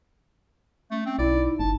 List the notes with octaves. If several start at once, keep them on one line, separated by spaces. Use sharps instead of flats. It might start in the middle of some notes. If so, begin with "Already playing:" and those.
A3 C#4
C4 C#4
B1 E4 D5
D#4
G1 A5